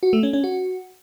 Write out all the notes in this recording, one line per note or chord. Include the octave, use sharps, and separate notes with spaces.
F#4
A3
C#4
C#4
F#4